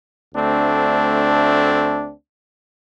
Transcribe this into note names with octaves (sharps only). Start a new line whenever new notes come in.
D2 A3 C4 D4